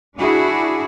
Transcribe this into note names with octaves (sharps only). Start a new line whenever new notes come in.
D4 E4 F#4 G#4